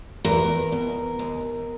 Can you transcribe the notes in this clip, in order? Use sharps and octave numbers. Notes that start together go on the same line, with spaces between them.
E2 A#4
B2
D#2